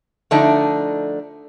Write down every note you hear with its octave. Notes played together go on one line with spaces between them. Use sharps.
D3 F3 A3 D4 D#4